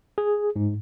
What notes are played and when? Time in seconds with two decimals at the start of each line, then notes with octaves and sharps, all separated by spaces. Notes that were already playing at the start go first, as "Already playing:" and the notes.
0.18 G#4
0.56 G#2